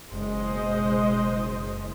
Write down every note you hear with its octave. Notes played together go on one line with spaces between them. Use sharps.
F#1 B2 G#3 C5 D#5